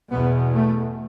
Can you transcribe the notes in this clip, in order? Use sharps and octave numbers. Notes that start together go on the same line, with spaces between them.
E2 B2 B3
A3